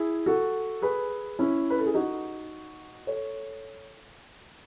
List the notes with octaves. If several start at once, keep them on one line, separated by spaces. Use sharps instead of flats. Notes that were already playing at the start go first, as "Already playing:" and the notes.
Already playing: E4 G#4
F#4 A4
G#4 B4
C#4 E4
B4
A4
G#4
D#4 F#4
A4 C#5